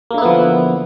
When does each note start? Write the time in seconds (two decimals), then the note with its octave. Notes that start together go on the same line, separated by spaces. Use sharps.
0.11 A#3
0.14 D3
0.18 E4
0.22 B3
0.25 F3